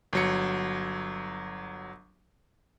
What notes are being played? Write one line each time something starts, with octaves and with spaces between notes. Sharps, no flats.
G1 F#3 C#7